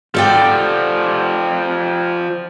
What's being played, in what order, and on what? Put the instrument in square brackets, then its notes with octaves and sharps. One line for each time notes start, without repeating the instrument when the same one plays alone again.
[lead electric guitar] F3 G4 [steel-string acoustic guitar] A4 D5 G5